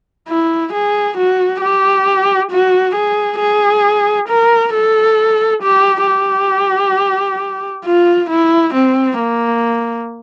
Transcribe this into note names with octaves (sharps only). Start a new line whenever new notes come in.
E4
G#4
F#4
G4
F#4
G#4
G#4
A#4
A4
G4
G4
F4
E4
C4
A#3